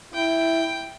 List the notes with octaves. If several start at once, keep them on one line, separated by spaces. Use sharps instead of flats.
E4 G5